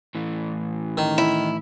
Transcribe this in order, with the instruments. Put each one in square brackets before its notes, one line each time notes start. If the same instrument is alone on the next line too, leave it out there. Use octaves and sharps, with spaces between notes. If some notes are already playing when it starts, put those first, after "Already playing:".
[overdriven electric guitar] A2 E3
[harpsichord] D#3
[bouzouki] E4